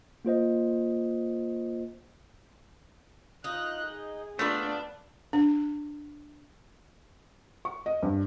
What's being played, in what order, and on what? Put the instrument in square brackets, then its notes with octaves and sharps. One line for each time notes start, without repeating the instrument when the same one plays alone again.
[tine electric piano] A#3 F4 C5 D#5
[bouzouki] D#4 [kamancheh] F4 F#6
[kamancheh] G#4
[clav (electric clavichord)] A3 [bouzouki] B3 F4 B4 [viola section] D4
[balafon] D4
[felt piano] C#6
D#5
G2